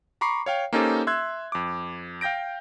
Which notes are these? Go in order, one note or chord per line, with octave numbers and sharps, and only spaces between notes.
A#5 B5 C#6 D6 C7
C#5 F5 G5
A#3 C#4 D#4 G4 A4 C5
E5 C6 E6 F#6 G#6
F2 D6
F5 G5 G6 A#6 D7